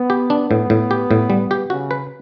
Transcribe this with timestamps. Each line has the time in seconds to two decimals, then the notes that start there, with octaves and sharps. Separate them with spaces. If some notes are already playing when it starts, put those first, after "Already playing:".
Already playing: B3
0.10 G4
0.30 D4
0.49 A2 B3
0.70 A2
0.91 G4
1.11 A2
1.30 G3
1.51 G4
1.70 C#3 F#4
1.91 B4